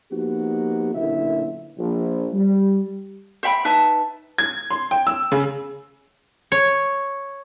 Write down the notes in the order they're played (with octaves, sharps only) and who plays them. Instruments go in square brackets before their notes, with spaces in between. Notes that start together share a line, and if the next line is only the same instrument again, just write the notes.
[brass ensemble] F3 A#3 B3 D#4 F#4 G4
B1 F#2 A#2 D3 E4 E5
A#1
G3
[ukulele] C5 E5 G5 B5
D#4 B4 E5 A5
[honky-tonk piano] G#6
C6
G5
E6
C#3
[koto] C#5